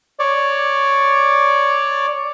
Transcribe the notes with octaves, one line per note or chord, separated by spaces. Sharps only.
C#5 D5